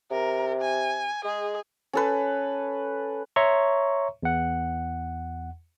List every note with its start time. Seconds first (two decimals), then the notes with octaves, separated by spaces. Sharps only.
0.11 C3 A#4
0.61 G#5
1.25 G#3 G#4
1.93 C#4 A4 B4
3.36 C#5 E5 A#5 C6 C#6
4.23 E2 F#5